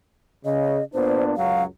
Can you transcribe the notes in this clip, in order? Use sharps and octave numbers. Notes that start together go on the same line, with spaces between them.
C#3 D#5
A#2 B3 D4 C5
C#2 F#2 F#3 F5